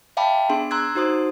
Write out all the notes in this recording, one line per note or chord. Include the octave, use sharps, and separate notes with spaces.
E5 F5 G5 A5 B5 D6
B3 D4 G#4 C6
A#5 C6 E6 F#6 G#6
D#4 F#4 C5 C6 D#6